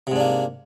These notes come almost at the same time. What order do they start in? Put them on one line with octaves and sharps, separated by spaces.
C3 G#2 D4 A#3